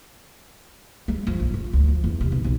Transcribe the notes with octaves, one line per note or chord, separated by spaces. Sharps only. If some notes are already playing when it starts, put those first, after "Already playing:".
G#3
F3
A#1
F3
D2
F3
E2
C3
B1
B1